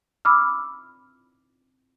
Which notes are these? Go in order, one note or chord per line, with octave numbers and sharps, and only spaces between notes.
B5 D6 E6 F6